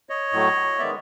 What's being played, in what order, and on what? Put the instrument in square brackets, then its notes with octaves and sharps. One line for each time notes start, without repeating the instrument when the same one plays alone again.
[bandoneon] C#5 D#5
A2 F#3 A3
D#3 G#3 B3 D5 E5